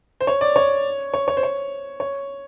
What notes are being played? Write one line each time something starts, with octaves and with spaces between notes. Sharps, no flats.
C5
C#5
D5
C#5
C#5
C#5
C5
C#5
C#5